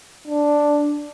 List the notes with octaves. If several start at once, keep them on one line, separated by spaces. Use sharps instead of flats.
D4